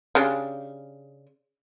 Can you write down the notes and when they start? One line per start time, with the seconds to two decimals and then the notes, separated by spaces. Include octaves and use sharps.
0.15 C#3 D4 G4